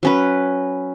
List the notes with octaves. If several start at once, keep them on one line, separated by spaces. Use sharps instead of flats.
F#3 C#4 B4